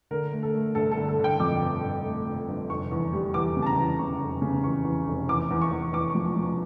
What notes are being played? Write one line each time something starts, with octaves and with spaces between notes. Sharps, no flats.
D3 A#4
A3
A4
A3
G1 A4
A4
D3
A4
D3 G5
F2 D6
G1
G1
A3
G1
G1
F1 C#6
E2
G3
E2 D6
C#3
A5
A#5
E2
C#3 C#6
F1
C#3
E2 C#6
E2
F1
E2 D6
E2
C#6
E2
E2 D6
F3 C#6
C#6
F3
C#6